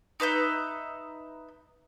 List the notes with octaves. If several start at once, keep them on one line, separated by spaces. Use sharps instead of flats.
D#4 B4 E5 G6